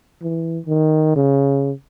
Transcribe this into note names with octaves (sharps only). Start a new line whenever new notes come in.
E3
D#3
C#3